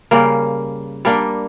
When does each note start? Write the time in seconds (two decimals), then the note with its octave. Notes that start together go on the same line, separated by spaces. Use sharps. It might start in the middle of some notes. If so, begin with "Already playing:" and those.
0.11 C#3 G3 A#3
1.05 G3 A#3 D4